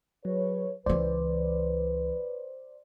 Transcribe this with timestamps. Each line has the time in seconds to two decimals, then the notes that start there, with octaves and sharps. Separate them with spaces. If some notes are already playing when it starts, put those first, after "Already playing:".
0.25 F#3 G#4 B4 C#5
0.86 C#2 E3 B4 C5 D5